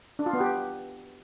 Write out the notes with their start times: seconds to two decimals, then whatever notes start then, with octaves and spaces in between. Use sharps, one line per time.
0.19 D4
0.26 F4
0.33 B3
0.41 G4